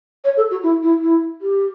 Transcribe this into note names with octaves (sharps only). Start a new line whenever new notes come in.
C#5
A4
F#4
E4
E4
E4
G4